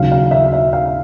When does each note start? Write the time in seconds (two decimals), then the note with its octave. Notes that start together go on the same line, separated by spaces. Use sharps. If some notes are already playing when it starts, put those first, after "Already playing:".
Already playing: D#2 C#3 F#3 F5
0.12 F5
0.31 E5
0.53 E5
0.73 F5